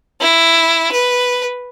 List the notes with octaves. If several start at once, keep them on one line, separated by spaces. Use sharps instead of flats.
E4
B4